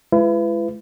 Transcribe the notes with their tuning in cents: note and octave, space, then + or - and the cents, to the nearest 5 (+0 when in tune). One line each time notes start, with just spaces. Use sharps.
G#3 +25 E4 +45 B4 +20